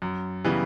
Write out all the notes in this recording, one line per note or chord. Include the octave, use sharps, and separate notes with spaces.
F#2
C#3 E3 G3 B3